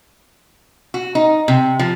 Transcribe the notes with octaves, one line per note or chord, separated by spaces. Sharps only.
F#4
D#4
C3
F3